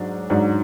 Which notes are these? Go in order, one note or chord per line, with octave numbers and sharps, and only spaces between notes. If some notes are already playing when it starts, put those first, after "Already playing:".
Already playing: G#2 F#3 D4
G#2 F#3 D4